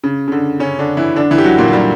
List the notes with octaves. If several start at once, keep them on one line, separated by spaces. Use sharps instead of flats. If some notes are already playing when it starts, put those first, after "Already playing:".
C#3
C#3
D3
C#3 C#4
D3 D4
E3 E4
D3 D4
E3 E4
G4
F#3 F#4
A#2 A#3
F#3
G3